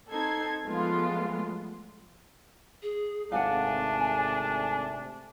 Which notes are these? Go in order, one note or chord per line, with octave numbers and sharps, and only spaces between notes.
C4 D#4 A4 G#6 C7
F3 F#3 G#3 A3 B3 F4
G#4
G#1 C3 A3 D4 F5 F#5 G#5